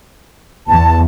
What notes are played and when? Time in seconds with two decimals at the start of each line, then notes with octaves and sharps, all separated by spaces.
0.67 E2 A5